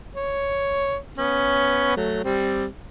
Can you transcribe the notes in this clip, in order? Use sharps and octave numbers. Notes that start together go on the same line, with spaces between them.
C#5
B3 C#4
F#3 A3
G3 C4